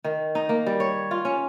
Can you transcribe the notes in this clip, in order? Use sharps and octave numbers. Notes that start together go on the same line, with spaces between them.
D#3
D#4
A#3
G3
C#5
F4
C#4